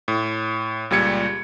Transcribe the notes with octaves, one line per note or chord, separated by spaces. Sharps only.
A2
C#2 A#2 G3 G#6 C#7